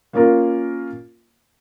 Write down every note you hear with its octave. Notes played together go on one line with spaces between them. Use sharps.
A#3 C#4 F4 A#4